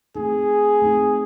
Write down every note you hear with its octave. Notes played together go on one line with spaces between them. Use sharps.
A3 C4 D#4 G#4
A3 C4 D#4